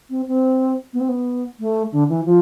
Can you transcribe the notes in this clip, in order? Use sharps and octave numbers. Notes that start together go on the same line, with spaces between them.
C4
C4
B3
C4
B3
A3
D3
E3
F3